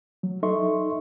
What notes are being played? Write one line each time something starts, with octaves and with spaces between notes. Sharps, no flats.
F#3
D#4 A4 D#5 E5 C6 C#6